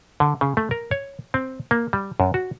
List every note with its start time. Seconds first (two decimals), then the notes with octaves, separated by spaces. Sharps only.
0.20 D3
0.41 C#3
0.57 A3
0.71 A#4
0.91 C#5
1.34 C4
1.71 A#3
1.93 G3
2.20 F#2
2.34 F#4